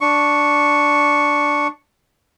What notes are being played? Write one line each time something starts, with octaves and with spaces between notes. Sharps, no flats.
D4 C#6